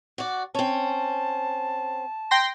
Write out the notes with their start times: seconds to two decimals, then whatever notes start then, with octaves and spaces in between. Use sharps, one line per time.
0.18 F#4 D5
0.55 C4 C#4 A5
2.31 G5 C6 A#6